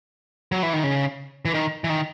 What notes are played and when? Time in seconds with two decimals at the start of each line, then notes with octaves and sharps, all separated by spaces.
0.52 F#3
0.63 E3
0.73 D#3
0.84 C#3
1.45 E3
1.54 D#3
1.84 E3
1.89 D#3